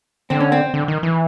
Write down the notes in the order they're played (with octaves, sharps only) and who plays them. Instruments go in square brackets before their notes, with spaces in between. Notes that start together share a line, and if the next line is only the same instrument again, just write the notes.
[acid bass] D3 [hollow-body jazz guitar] C4
[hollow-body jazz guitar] C#4
C4
[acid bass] D3
D#3
E3